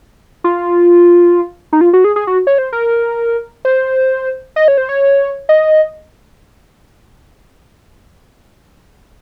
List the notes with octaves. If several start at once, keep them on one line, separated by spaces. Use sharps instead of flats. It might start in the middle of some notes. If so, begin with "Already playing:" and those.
F4
D#4
F4
F#4
G#4
G#4
F#4
C#5
C5
A#4
C5
D#5
C#5
C5
C#5
D#5